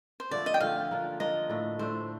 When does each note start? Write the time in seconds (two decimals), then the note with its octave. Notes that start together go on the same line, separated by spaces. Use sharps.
0.20 C5
0.31 D3 F3 A3 D5
0.46 D#5
0.54 G5
0.60 D3 F3 A3 F5
0.91 F3 A#3 D4 F4
1.20 F3 A#3 D4 F4 D#5
1.49 A2 A3 D4
1.79 A2 A3 D4 C5